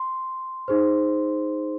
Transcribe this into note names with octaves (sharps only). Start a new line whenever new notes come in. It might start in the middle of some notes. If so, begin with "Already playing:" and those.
Already playing: C6
D#4 G#4 C5